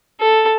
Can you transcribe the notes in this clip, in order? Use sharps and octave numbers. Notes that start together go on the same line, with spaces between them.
A4